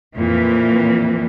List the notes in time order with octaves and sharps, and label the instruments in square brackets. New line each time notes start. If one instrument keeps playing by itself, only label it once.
[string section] F2 A#2 E3